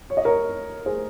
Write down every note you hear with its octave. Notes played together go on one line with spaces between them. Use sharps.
C#5
D#5
A#4 C#5
G#4 C5